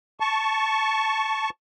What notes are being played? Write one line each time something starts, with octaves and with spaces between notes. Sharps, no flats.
A5 C#6